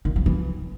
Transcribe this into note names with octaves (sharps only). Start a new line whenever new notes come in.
D#3
F3
E3